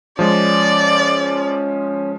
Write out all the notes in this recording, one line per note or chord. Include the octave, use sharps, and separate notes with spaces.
F3 G#3 C#4 D5